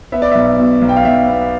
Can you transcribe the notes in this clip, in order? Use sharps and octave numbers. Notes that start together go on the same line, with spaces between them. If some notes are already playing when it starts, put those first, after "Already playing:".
B3 E5
D5
B1 E5
B2
B1
G5
F5
B1 E5
B3